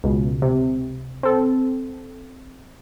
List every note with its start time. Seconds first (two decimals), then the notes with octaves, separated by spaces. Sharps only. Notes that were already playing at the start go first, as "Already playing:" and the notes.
0.04 C#2 B2
0.42 C3
1.23 C4 A4